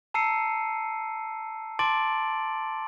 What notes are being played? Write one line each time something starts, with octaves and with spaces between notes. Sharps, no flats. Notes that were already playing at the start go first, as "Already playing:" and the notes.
A5 A#5 E6 C7 C#7 D#7
A5 C6 D6 A6 D7 F#7